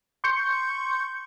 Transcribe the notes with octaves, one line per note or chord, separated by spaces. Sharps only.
C6 C#6 G6 C#7